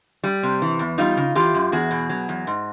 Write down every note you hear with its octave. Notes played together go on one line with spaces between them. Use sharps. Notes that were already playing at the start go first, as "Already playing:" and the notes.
G3
C3
E3
E2
G3 D#4 F4
C#3
E3 F4 G4
F#2
E2 F#4 G#4
B2
F#3
E2
G#2